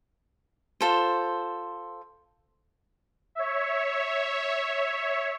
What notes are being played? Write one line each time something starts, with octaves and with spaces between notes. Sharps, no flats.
F4 A4 C5
C#5 E5